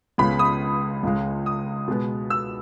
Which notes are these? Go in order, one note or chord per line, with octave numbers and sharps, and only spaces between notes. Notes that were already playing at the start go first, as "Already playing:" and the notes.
C#2 C#3 G#3 B3 B5
D#6
C#2 C#3 G#3
D#6
B2 G#3 B3
E6